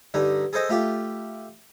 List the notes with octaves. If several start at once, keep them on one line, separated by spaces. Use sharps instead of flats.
G2 D3 D#4
G#4 A4 C5 D#5
A3 F4 G4